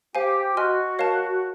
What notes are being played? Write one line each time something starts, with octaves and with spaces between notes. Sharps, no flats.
G4 C5 F5 G#5
F#4 D#5 G#5 C6 F6
A#4 C#5 F5 A5